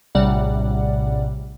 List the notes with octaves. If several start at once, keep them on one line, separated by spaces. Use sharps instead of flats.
A#1 A2 C3 G3 D5 F#5